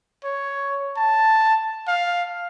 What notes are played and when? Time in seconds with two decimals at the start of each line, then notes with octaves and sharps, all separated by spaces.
0.24 C#5
0.97 A5
1.88 F5